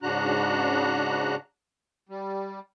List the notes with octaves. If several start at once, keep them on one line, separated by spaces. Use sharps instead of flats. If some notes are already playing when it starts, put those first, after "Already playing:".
G#2 C#3 D4 F#4 A#5 F#6
G3